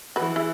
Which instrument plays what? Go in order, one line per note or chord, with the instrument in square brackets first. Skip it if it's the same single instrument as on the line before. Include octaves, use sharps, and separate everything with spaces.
[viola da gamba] E3 [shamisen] F#4 B4
[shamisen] E4 G#4